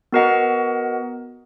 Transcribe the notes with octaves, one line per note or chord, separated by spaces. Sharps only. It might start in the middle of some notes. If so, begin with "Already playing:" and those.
B3 F#4 A#4 D#5 F#5